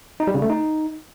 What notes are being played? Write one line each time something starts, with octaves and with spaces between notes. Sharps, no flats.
D#4
G3
C#3
A3
D#4